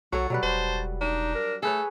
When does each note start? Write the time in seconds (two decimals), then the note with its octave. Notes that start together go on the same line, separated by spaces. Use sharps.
0.12 B1 F#3 F#4 A4 C#5
0.30 B2 F#3 G3 B4
0.43 E1 C5 A5
1.01 D4 D#4
1.35 A#4
1.63 A3 G#4 A4 B4 C#5